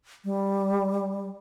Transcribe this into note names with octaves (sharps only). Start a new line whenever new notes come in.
G3